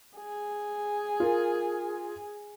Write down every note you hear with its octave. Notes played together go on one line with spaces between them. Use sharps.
G#4
F4 A#4